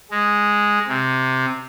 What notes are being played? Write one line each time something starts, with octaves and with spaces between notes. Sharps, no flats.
G#3
C3